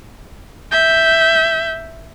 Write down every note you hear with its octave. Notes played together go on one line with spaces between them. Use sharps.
E5 G6